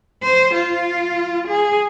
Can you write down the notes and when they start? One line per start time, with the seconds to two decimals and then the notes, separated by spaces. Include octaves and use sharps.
0.23 C5
0.54 F4
1.48 G#4